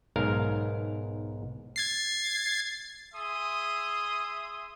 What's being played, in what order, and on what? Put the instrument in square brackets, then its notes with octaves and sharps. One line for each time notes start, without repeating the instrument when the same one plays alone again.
[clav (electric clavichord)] B1 G#2 A#4 F5
[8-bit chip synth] G#6 A6 C7
[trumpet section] G#4 E5 C6 D#6